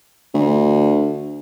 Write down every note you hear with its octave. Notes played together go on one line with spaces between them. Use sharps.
D2